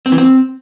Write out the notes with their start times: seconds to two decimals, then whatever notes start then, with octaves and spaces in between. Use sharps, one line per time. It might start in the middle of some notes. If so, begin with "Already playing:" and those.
0.06 C4
0.12 E3
0.18 C4